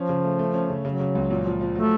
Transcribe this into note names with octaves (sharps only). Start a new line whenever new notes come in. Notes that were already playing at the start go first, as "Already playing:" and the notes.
Already playing: F3 C#4
C#3
A3
A3
C#4
C#3
C#3 F#3
C#3
C#2
A#2
F3
F3
F#3 A3